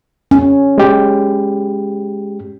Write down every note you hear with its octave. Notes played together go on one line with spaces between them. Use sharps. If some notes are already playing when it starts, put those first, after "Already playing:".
C#4
G#3 G4